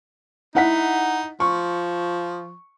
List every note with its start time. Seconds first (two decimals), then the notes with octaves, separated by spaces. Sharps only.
0.55 D#4 E4 F#5 B6
1.40 F3 C#6